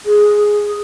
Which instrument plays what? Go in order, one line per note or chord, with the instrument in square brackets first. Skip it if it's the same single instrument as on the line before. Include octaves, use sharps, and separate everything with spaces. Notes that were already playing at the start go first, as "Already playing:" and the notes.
[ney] G#4